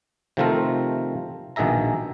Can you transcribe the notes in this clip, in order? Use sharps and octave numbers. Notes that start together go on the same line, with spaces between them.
C3 D#3 F3 A3 C4 A#4
A#1 B2 D#3 G#4 E5 A#5